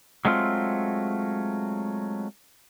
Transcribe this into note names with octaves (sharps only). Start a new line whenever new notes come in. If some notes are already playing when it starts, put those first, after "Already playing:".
F#3 G#3 A3 C4 F4